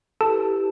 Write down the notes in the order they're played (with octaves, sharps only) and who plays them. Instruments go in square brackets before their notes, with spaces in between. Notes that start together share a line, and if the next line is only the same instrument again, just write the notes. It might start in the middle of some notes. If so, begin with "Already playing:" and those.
[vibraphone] E4 G4 B4 [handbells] A4 A5